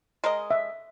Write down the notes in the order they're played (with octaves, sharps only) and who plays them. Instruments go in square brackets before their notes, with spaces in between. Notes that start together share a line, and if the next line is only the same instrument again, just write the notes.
[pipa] G#3 A#4 D#5
[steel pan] E5